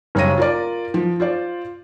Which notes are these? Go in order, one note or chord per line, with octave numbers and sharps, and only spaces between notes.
F#1 G3 C#5 F5 A#6 D#7
F4 A#4 D5
F3
F4 C5 D5